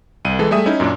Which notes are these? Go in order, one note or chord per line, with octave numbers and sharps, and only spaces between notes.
C2 D#7
E3 G#3 A4
G3 A3 G#4 E5 D#6
C#4 D#4 E4
F#2 A#2 A#3 D4